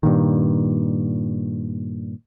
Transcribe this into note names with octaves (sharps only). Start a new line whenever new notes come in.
G2 A#2 D#3